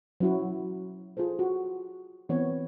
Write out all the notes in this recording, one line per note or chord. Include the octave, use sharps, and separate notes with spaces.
F#3 C#4 E4 F#4
F4 G#4 A4 C5
F#4
E3 B3 C4 C#5